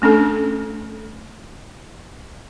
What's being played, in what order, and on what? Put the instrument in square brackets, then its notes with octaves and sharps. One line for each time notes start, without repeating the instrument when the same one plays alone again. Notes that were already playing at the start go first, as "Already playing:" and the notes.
[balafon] A3 C#4 D4 A4